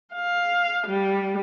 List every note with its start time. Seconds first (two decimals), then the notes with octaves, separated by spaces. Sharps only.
0.14 F5
0.87 G3